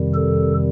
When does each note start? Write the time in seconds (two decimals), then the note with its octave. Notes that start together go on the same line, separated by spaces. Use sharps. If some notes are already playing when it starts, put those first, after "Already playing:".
Already playing: F2 C3 D#3 G3
0.15 A4